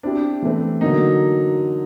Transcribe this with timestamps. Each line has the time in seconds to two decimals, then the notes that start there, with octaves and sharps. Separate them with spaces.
0.03 C4 D4 E4 G4
0.42 E3 A3 C4
0.81 D3 F#3 A#3 D#4